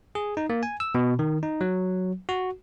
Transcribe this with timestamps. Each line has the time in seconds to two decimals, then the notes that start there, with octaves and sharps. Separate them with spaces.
0.15 G#4
0.37 D#4
0.50 A#3
0.63 G#5
0.80 E6
0.95 B2
1.19 D#3
1.43 D#4
1.61 F#3
2.29 F#4